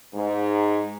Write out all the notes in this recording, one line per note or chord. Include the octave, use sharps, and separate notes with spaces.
G#2